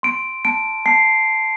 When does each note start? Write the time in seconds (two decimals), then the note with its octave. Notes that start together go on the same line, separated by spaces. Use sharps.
0.03 C6 D7
0.45 A5 D7
0.86 A5 C7